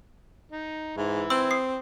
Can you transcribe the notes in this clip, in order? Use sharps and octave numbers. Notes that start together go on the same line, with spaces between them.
D#4
G#2 E3 E4
C4 C6 E6
D#6 C7